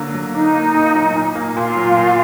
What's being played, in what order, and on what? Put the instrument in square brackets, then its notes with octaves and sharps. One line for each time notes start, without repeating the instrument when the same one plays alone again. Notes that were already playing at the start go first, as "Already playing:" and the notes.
Already playing: [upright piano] D3 F#3 A#3
F#3
[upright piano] D4 [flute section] D#4
[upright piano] A#3
A#2
F#3
A#2
A#3
[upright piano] A#2 [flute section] F4
[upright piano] F#3
A#2